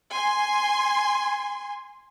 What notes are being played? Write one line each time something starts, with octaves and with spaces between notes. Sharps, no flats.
G#5 C6